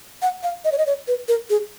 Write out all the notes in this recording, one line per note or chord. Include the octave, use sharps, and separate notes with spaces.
F#5
F5
D#5
C#5
D#5
C#5
B4
A#4
G#4